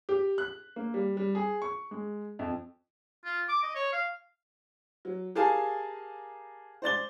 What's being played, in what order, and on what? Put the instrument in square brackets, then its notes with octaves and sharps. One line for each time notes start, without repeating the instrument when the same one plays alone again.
[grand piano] G4
F#6
A#3
G3
G3
G#4
C#6
G#3
F2
[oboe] F4
D6
D#5
C#5
F5
[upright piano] F#3
G4 G#4 A#4 F5 G#5 A5
C5 D5 A6 G7